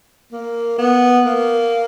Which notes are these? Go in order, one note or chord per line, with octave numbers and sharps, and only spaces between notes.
A#3
B3
A#3